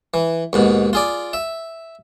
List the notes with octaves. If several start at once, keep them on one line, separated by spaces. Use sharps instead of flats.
E3
D#2 G#2 B2
F4 G#4 D5
E5